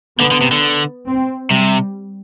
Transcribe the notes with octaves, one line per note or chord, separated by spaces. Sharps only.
D3 B3
D3
C3
D3
C4
C3 G3